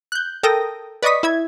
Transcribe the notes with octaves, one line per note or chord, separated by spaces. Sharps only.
F#6 G6
A4 A#4 G5 D#6 A#6
B4 D5 D#5 C#6 D#6 B6
E4 E5 G#6